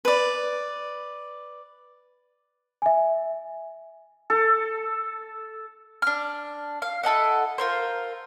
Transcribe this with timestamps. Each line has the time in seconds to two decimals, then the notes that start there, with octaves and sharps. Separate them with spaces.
0.05 B4 D5
2.82 E5 G#5
4.30 A4
6.02 D4 F6
6.82 F5
7.03 E4 A4 D#5 F#5
7.58 F4 A#4 C5